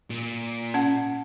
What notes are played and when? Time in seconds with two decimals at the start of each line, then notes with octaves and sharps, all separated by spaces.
0.10 A#2
0.74 C#4 F#5